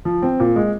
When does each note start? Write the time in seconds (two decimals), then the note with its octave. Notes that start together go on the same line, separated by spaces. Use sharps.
0.05 F3
0.22 C4
0.40 A#2
0.56 G#3